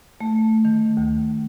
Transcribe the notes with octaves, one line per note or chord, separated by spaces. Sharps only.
A3
D#3
D2